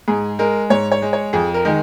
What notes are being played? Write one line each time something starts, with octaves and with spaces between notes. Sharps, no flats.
G#2 G#4
G#3 A#4
G#2 C#5
C#5
G#3
C#5
F2 G#4
A#4
D#3 G#3